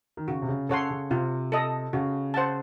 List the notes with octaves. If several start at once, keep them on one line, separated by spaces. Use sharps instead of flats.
D#3
C#3 F#4
C3
C#3
C#3 A4 C#5 F#5 C6
C#3
C3 F4
A4 D#5
C#3 F#4
C5 F#5 A5